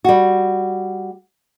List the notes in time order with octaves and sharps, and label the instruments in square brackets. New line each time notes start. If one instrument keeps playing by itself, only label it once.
[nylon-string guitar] G3 F#4